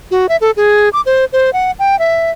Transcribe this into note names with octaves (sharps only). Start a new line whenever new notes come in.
F#4
E5
A4
G#4
D6
C5
C5
F#5
G5
E5